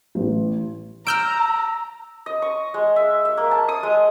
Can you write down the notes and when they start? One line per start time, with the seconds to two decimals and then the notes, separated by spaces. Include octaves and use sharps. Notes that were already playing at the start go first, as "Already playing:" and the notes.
0.15 A1
1.07 A#5 E6 F6 G6 D7
2.26 D#5
2.42 C#6
2.74 G#3
2.96 E5
3.25 E5
3.37 A#3
3.51 A5
3.68 D#6
3.83 G#3